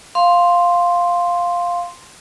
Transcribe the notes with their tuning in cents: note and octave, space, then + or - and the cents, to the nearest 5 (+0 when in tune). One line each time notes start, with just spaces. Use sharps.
F5 +5 C6 +0